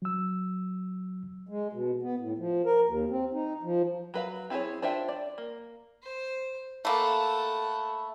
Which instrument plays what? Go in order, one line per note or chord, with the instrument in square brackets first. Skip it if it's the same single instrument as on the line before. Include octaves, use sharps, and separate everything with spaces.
[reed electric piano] F#3 E6
[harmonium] G#3
B2
B3
A2
F3
A#4
D#2
C4
D#4
F3
[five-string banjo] F#3 B4 F5
C4 E4 F4 G#4 C#5
D4 F4 C5 E5 G5
D5
A#3
[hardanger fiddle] C5
[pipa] A3 A#3 [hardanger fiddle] A4 F#5 [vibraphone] B5